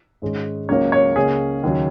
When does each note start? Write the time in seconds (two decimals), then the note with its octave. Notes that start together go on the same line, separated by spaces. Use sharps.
0.22 G#2 D#3 G#3 C#4
0.69 C#2 C#3 F#3 A#3 C#5
0.92 C#5
1.16 C#2 C#3 A#3 C#4 G#4
1.63 D#2 C#3 F#3 C#4